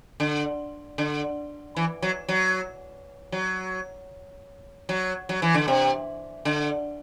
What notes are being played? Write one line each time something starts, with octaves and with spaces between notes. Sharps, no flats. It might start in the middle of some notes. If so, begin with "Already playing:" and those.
D3
D3
E3
F#3
F#3
F#3
F#3
F#3
E3
D3
C3
D3